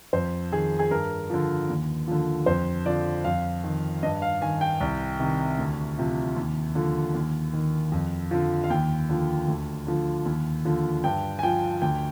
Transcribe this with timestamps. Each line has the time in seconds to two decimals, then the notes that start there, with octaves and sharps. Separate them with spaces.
0.13 F2 C5
0.52 D#3 G#4
0.79 G#4
0.91 G2 A#4
1.30 D3 F3
1.69 D#2
2.08 D3 F3
2.46 F2 C5
2.86 D3 F3 D5
3.24 F2 F5
3.64 D#3
4.02 G2 D#5
4.22 F5
4.41 D#3 G#5
4.61 G5
4.80 C2
5.19 C3 D#3
5.58 D2
5.98 C3 F3
6.36 D#2
6.75 D3 F3
7.14 D#2
7.53 D#3
7.92 F2
8.31 D3 F3
8.64 F5
8.70 D#2 G5
9.09 D3 F3
9.48 D2
9.87 D3 F3
10.26 D#2
10.65 D3 F3
11.04 G2 G5
11.39 G#5
11.43 F3 G5
11.82 D2 G5